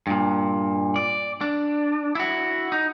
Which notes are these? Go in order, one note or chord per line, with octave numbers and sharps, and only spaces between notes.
G2 A#2
D5
D4
E4 F#4
D#4